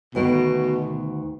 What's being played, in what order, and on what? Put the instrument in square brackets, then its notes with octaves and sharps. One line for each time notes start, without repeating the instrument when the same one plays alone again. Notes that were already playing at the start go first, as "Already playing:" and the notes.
[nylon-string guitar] D2 D#3 B3 [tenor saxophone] B2